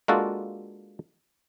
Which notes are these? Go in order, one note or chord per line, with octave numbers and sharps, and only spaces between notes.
G#3 A#3 D4 F4 F#4 A4